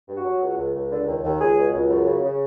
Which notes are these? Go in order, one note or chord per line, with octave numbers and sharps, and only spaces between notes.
G2
F#4
F#3
C#2
C#2
C#2
D3
D#2
D#2
C#2 G#4
B2
C#2
F#2
C#3
C#3